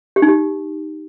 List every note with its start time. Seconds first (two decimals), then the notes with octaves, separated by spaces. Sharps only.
0.16 G4
0.22 D#4
0.28 G4